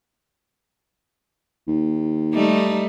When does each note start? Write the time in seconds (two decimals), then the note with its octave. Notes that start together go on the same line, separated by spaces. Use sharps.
1.67 D#2
2.34 G3 A3 D#4